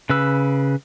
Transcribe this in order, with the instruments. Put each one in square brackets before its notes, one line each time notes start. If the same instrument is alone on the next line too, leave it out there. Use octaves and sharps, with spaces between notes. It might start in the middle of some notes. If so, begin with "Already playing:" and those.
[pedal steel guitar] C#3 B4 E6